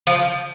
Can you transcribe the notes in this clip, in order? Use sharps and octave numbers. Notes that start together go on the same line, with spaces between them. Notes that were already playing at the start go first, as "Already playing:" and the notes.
F3